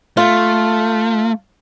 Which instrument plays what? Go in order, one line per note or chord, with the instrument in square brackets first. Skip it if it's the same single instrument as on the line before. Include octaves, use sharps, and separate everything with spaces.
[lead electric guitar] A3 [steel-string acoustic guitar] F4